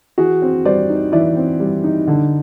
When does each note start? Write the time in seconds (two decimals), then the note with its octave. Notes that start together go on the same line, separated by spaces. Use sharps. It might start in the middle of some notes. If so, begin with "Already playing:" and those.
0.18 E3 F#4 G#4
0.42 C4
0.65 G3 C5 D5
0.90 D#4
1.12 E3 D5 E5
1.37 C4
1.60 G3
1.84 D#4
2.08 D3